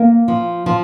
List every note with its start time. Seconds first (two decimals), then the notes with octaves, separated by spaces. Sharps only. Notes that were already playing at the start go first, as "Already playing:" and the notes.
Already playing: A#3
0.28 F3
0.66 F3